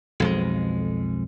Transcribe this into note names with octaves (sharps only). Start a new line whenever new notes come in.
B1 F2 G#3